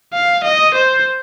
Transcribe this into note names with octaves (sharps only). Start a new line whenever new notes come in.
F5
D#5
C5